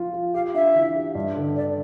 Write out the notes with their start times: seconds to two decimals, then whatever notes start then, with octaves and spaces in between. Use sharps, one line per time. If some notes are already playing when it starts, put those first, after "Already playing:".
Already playing: F3 F4
0.13 F4
0.34 G4 F5
0.54 D4 E5
0.75 E3
0.96 G4
1.15 G2
1.36 D3
1.56 D3 D5